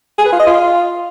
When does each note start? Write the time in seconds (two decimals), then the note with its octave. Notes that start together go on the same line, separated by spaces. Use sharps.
0.18 G#4
0.25 B4
0.32 F4
0.40 D#5
0.47 F4